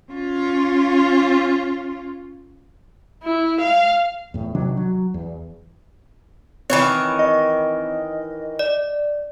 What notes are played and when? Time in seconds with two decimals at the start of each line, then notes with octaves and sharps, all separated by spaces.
0.13 C#4 F4
3.23 E4
3.61 F5
4.34 E2 A2
4.55 C3 D#3 F#3 D4
4.77 F#3
5.14 E2
6.70 D#3 E3 C4 C#5 B5
7.19 D#5
8.59 D5